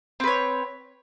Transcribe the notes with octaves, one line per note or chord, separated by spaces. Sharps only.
C4 B4 C#5